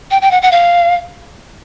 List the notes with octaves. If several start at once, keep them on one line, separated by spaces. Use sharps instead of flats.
G5
G5
F#5
F#5
F5